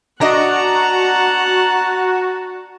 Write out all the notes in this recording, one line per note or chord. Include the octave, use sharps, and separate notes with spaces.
D4 F#4 D#5 F#5 A5 A#5